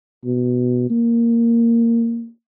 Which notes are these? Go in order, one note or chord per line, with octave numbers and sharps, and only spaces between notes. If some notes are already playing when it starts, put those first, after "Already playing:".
B2
A#3